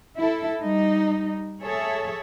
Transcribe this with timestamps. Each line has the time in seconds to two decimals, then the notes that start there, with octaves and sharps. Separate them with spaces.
0.17 E4 A4
0.62 G3 D#4
1.61 G#4 A4 C#5 E5